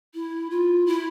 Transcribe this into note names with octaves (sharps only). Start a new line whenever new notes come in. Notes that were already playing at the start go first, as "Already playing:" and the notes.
E4
F4
E4